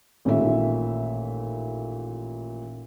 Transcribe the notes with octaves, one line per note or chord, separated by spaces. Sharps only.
A1 A#2 D#3 A3 E5